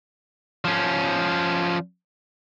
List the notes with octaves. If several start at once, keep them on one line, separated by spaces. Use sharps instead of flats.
F3 C#4